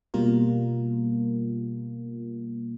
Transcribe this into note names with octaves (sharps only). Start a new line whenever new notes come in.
B2 G3 A#3 F4 A#4